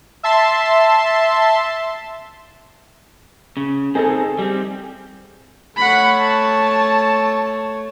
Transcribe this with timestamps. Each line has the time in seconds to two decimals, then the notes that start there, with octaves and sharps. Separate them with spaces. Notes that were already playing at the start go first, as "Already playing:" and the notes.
0.23 E5 A5 C6
3.57 C#3
3.95 C4 D#4 G#4 A4
4.39 G3 C4
5.77 A3 C#5 F#5 B5
6.19 A5